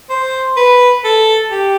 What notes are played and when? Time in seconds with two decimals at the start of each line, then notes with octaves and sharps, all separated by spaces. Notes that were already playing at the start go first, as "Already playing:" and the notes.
0.10 C5
0.57 B4
1.04 A4
1.51 G4